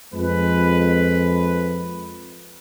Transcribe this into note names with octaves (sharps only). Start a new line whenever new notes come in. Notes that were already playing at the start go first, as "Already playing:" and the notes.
F2 G#3 B4